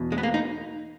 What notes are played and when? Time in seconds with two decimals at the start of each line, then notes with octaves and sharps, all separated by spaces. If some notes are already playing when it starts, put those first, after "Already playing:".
Already playing: E2 B2
0.12 G#3
0.18 B3
0.23 A#3
0.34 D#4